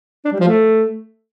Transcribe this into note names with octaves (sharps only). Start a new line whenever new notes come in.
D4
G3
F3
A3